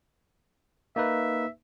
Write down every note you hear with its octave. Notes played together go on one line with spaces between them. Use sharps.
A#3 D#4 B4 E5